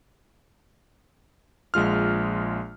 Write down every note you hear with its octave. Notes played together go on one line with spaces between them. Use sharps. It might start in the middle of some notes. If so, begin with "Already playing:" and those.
A#1 G#3 F4 F6